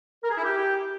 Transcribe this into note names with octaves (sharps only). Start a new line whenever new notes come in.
A#4
G#4
E4
G4